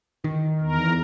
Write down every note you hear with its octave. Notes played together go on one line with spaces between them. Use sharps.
D#3
E2 A#4